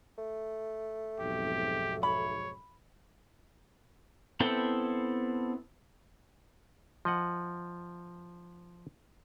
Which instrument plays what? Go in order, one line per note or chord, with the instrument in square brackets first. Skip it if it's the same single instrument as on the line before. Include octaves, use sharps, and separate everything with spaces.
[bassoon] A3
[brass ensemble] B1 F2 G#2 [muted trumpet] G4
[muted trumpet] C#5 [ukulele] B5
[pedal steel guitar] B3 C4 E4 A4 G5
[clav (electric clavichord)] F3 D#5 F#5